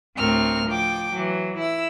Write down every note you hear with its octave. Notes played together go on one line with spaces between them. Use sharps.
D2 A2 C4 A#4 C#6 F6
F3 G5 D6
E3 F#3
E4 E6